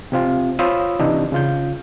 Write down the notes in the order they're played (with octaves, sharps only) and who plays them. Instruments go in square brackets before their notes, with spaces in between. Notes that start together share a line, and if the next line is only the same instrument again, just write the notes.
[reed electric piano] C3 C4 F4
F4 C5 C#5 B5 D#6 E6
C3 E3 D4 D#4
C#3 F4 G6